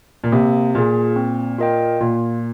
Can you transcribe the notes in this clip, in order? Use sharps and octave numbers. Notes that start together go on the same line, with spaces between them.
A#2
C3 A#3
A#2 F4 G#4
C4
F4 A#4 D#5 G5
A#2 F4